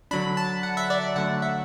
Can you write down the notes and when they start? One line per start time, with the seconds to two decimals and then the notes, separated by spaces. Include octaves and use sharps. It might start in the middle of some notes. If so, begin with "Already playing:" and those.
0.11 D3 F#3 D4 B5
0.37 A5
0.63 F#5
0.77 E5
0.90 D5
1.16 D3 F#3 A3 D4 F#5
1.42 E5